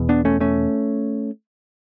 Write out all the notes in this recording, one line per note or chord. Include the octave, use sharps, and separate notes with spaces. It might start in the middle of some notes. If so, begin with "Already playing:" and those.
Already playing: E2 B2
B3 D4
A3 C#4
A3 C#4